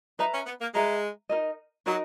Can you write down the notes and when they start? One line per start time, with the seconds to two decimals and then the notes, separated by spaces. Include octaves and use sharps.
0.19 D#4 B4 E5 A#5
0.33 C#4
0.46 B3
0.61 A#3
0.74 G#3 B4 E5 A#5
1.29 D#4 F#4 A#4 D#5
1.86 F#3 D#4 F#4 A#4 D#5